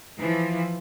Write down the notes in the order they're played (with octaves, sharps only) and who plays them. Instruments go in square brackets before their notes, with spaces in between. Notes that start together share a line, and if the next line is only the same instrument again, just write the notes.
[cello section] E3 F3